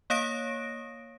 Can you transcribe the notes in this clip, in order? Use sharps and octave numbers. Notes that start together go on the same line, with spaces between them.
A#3 C#5 F5 D#6 A#6 D7